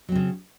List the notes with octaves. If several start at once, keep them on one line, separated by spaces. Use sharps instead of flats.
C#3 F#3 C4